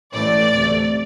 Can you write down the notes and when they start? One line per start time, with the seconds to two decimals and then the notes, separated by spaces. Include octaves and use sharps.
0.14 A1 A2 E3 A3 D5
0.54 D2 C3 A3